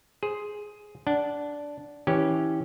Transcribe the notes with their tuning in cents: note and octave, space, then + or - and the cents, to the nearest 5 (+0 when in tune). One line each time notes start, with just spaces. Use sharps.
G#4 +5 C5 +0
D4 -10 F#5 +10
E3 -25 C#4 +0 G4 -5